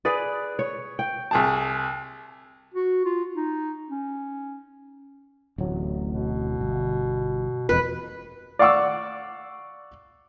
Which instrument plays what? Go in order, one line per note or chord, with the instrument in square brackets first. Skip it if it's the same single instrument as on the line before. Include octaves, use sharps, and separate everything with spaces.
[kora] G#4 B4 D5
C#5
G5
[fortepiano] C2 G#4 A5
[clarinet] F#4
F4
D#4
C#4
[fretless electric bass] D1 A1 F#3
[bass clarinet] B2
[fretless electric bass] G1
[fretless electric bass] E1 F3 [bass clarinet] F2 [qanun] B4
[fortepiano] D5 F5 F#5 C#6 D6 E6